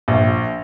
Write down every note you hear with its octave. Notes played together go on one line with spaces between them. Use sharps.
A#1